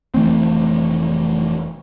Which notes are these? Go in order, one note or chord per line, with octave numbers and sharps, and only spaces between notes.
F1 E3 A3 C4